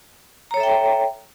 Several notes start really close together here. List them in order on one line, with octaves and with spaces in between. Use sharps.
A#5 C#5 A4 E5 G5